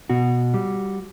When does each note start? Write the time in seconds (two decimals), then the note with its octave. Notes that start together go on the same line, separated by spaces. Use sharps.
0.10 B2 F#4
0.54 G3